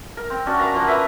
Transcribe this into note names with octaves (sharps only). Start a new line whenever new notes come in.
A#4
C4
C#4 D4 F#4
A#4 F5 A#5 B5
F3 A#3 F#5
B4 E5 F#5 A#5